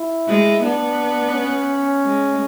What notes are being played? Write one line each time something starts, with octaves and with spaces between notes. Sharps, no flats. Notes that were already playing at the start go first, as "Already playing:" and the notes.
Already playing: E4
G#3
B3 D4
C#4
G#3